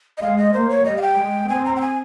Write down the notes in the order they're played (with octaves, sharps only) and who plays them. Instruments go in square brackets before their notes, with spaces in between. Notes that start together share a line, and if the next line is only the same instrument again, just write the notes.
[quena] D#5
[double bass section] G#3 [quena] F5
[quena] D#5
[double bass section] A#3 [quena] C5
[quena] C#5
[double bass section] G3 [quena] D#5
[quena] F5
G5
[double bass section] G#3
[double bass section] C4 [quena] G#5
[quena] A#5
G5
G#5